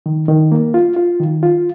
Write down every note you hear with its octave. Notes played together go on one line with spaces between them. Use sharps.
D#3
D#3
A#3
F4
F4
D#3
F4